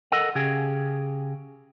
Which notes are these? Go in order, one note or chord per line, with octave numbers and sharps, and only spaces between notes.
A4 A#4 D#5 F#5
C#3 G4 G#4